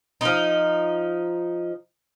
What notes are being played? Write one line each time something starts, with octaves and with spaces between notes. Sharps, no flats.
F3 D#4